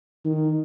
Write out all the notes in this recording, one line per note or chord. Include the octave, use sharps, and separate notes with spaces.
D#3